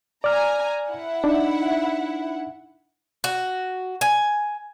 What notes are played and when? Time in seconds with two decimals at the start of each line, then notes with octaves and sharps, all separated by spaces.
0.24 D5 G#5 A#5 F6
0.90 E4 F#5
1.24 D4 D#4
3.24 F#4
4.01 G#5